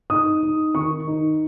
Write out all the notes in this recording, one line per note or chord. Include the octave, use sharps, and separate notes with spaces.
D#4 D#6
D#4
D#3 C#6
D#4